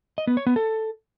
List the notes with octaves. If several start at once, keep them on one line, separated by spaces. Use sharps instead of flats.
D#5
B3
C#5
B3
A4